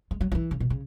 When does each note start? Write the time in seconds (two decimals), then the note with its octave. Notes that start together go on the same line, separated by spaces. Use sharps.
0.11 G#3
0.21 F#3
0.32 F#3
0.35 E3
0.51 C#3
0.60 B2
0.70 C#3